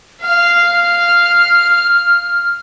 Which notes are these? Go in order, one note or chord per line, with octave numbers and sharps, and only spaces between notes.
F5 F6